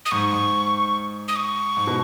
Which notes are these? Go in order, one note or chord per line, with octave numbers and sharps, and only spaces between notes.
D#6
G#2 C#6
G#2
D#6
C#6
G#2
B2